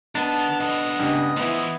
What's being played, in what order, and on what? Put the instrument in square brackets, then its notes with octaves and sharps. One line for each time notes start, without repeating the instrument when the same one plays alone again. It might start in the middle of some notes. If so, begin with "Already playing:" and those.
[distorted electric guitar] D#3 D#5 [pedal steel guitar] B3 D4 [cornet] A5
[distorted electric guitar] B2 A4 [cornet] D#5
[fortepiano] C#2 G2
[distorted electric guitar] E3 F3 [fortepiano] B3 E4